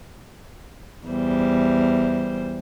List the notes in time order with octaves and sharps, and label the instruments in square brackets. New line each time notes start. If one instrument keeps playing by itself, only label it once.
[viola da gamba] E2 G3 C5